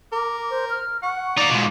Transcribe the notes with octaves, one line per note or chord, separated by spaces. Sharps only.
A#4 D6
C5
F6
F#5 C#6
A#3 D#4 D5 D6
G#2 B2 F4